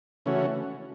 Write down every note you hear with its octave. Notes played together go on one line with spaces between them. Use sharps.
C#3 E3 A3 C#4 F#4